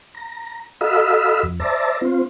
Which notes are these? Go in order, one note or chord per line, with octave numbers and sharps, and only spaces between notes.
A#5
F#4 A4 D#5 F5 B5 E6
F2
C5 D5 E5 A5 A#5
C4 F4 C5